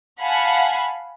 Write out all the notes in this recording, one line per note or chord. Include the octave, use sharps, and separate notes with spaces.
F5 F#5 G#5 A5 B5